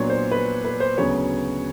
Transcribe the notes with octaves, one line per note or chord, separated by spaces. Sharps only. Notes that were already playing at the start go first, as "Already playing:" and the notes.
Already playing: A#2 F#3 B3 D4 C#5
C5
B4
B4
C5
D2 C#3 F#3 B3 C#5